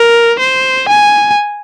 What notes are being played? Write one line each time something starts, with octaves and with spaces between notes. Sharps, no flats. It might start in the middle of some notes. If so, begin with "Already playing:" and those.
Already playing: A#4
C5
G#5